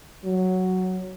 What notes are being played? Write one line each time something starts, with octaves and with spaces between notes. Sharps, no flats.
F#3